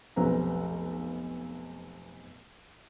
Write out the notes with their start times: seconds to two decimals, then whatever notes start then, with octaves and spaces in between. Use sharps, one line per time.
0.16 F1 B1 C4 B4 A#5